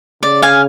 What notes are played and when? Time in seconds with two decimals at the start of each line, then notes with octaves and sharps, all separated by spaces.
0.23 C#3 D5
0.42 F5 G#5